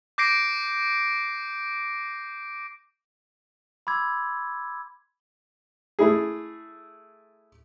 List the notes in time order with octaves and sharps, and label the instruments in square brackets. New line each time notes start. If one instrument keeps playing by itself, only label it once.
[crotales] D6 G6 A#6 C7 D7
[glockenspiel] B5 C6 D6 E6 G#6
[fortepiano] A3 E4 G#4